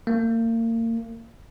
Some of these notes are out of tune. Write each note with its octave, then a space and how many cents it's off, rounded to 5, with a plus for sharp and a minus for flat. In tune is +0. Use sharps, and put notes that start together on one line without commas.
A#3 -35